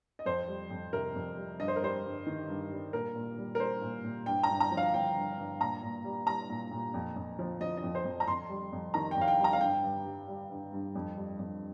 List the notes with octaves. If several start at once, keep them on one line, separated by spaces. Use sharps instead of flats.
D#5
F2 C5
G3
F2
C3 A#4
F2
G3
G2 D#5
C5
A#4
G3 C5
G2
D#3
G2
G3
A#2 A#4
A#2
G3
A#4
G3 C5
A#2
A#2
G2 G5
A#5
G2
A#5
F3
F5
F3 G5
G2
G2
A#2 A#5
A#2
G3
G3 A#5
A#2
A#2
F2
F2
F3
F3 D#5
D#5
F2
C5
F2
A#5
F2 C6
G3
F2
D#3 A#5
G5
F2 F5
G5
G3
A#5
F5
G2 G5
G2
G3
G3
G2
G2
F2
G3
F2